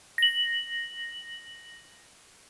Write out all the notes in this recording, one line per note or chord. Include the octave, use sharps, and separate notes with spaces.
A#6 F#7